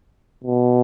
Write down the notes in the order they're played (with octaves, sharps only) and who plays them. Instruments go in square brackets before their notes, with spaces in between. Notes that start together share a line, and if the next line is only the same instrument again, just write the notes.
[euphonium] B2